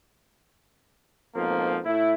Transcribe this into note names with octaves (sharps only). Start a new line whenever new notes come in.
F2 G#2 B2 F3 A#3
A2 A3 E4